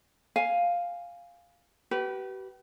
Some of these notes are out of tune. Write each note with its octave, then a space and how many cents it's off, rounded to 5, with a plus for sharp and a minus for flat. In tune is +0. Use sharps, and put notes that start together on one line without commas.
F5 +0 G#5 +0
G4 -40 B4 -10